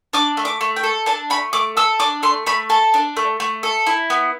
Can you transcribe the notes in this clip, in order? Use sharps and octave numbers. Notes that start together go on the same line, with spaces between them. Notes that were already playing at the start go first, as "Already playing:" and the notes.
D4 D6
A3
D6
A3
G5
A4
D4 A5
A3 B5
A3 D6
A4 E6
D4 D6
A3 C6
A3 B5
A4 A5
D4
A3
A3
A4
E4
B3